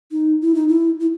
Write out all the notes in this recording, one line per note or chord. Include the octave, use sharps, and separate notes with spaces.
D#4
E4
D#4
E4
E4